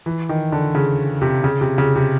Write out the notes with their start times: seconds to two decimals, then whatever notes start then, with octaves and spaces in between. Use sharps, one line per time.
0.06 E3
0.29 D#3
0.52 D3
0.75 C#3
1.22 C3
1.44 C#3
1.61 C3
1.78 C#3
1.96 C3